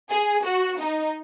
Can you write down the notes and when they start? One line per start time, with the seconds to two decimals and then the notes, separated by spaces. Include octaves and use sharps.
0.11 G#4
0.46 F#4
0.81 D#4